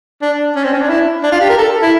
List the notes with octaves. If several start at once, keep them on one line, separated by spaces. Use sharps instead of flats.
D4
C#4
C4
C#4
D4
E4
D4
F4
G4
A#4
A4
E4